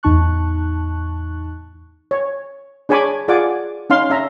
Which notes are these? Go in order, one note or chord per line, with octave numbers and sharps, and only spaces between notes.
E2 A2 D#4 A5 C#6 F#6
C#5
D4 G#4 C#5 G#5 B5 D6
F4 G#4 D5 F#5 G#5 D6
C#4 D#4 F5 C6
C#4 E5 A#5